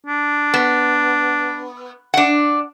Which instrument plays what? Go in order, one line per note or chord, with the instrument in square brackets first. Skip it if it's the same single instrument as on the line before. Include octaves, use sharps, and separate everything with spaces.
[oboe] D4
[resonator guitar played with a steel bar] B3
D4 F#5